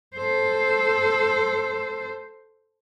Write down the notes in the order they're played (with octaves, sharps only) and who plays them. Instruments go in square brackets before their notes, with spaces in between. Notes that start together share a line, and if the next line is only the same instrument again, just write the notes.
[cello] A4 C5